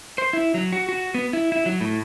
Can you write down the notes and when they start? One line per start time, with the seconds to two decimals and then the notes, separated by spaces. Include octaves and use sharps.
0.18 C5
0.33 E4
0.54 F#3
0.73 F#4
0.89 F#4
1.15 B3
1.33 E4
1.52 E4
1.66 F#3
1.80 A2